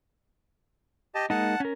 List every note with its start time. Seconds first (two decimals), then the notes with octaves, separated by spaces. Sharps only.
1.15 G4 D#5 A5
1.30 G#3 A#3 D#4 F#5 A5
1.60 C#4 A#4